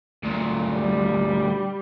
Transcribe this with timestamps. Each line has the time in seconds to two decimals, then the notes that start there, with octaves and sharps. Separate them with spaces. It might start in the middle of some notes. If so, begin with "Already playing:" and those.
0.24 D2 A#2
0.74 G3